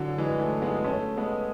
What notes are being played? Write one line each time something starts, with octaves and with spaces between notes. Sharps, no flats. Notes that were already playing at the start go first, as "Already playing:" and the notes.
Already playing: D3 E3 F#3
E3 G#3
F#3 A3
G#3 B3
A3 C#4
G#3 B3